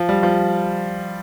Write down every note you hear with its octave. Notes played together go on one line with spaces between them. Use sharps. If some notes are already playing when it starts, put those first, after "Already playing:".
Already playing: F3
G3
F3